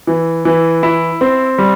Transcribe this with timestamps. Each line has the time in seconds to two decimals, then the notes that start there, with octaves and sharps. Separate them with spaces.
0.07 E3
0.45 E3
0.83 E4
1.21 C4
1.58 G3